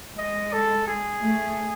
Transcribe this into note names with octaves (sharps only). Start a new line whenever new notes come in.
G#3 D#5
A4
G#4
A3